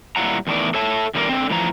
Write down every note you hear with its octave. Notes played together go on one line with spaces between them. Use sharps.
A#2 G3 E4 F4 F#5 A#5
E2 A2 D#3 D5
A4 C#5 E5 A5
E2 D3 G3 D#4 A#4 D5
D3 C4
A2 E3 F3 A#5